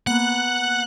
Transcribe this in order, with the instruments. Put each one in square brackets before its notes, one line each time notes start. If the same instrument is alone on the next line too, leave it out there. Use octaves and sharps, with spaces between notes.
[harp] A#3 B3 [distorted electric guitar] F#5 [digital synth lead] F#6